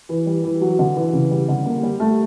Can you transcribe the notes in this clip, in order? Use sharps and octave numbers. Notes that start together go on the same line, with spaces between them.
E3
G3
E3
F#3
D3
E3
C#3
G3
D3
A#3
G3
A3